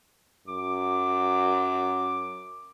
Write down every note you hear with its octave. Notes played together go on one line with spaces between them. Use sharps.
F#2 D6